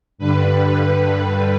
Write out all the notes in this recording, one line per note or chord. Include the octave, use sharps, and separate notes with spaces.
G2 D3 G3 B4